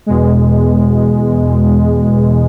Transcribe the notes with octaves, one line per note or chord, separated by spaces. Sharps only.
E2 B2 G#3